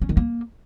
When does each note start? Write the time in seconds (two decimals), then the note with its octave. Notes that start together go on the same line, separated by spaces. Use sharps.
0.02 C#4
0.09 D#3
0.17 A#3